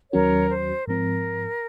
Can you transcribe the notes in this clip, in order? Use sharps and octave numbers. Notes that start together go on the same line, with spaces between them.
D#2 D#3 F#3 C#4 F#4 A#4 C#5
C5
G#2 F3 C4 A#4